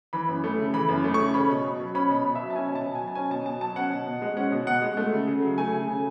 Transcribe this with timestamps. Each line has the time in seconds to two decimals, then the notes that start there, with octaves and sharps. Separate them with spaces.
0.13 E3 B5
0.29 F#2
0.44 A3
0.58 C#3
0.74 E3 B5
0.89 F#2
1.04 A3
1.14 C#3 C#6
1.34 C#4 B5
1.49 B2
1.64 B2
1.80 F#3
1.95 C#4 B5
2.10 B2
2.15 B5
2.25 B2
2.35 E5
2.41 F#3
2.50 A5
2.55 C#4 G#5
2.71 B2 A5
2.86 B2
2.95 G#5
3.00 F#3
3.08 A5
3.15 C#4 G#5
3.31 B2 A5
3.46 B2 A5
3.61 F#3 A5
3.76 C#4 F#5
3.91 B2
4.06 B2
4.22 G#3
4.37 C#4 F#5
4.52 B2
4.67 B2 F#5
4.82 G#3
4.97 A3
5.13 C#3
5.27 C#3
5.43 F#3
5.58 A3 G#5
5.73 C#3
5.87 C#3